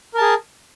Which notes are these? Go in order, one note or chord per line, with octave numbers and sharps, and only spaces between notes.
G#4 A#4 A5